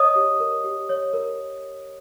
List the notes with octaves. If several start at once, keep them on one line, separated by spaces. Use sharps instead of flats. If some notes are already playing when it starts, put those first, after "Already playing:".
Already playing: C#5 D#5 D#6
G4
A#4
G4
C#5
A#4